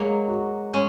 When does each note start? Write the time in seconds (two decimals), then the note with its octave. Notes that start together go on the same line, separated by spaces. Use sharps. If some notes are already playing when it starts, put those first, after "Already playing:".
Already playing: F#3 G#3 A#3
0.28 F#4
0.73 G#3 C#4